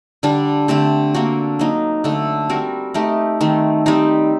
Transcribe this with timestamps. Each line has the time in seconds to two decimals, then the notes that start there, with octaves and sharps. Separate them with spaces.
0.23 D3 G3 D4
0.68 D3 A3 C4 G4
1.14 A#3 D4 F#4
1.59 F#3 A#3 D#4
2.04 D3 A3 D4 A4
2.49 G3 C4 F#4 A#4
2.94 A3 D#4 G4 A#4
3.41 D#3 A3 C4
3.86 G3 C4 D#4 G4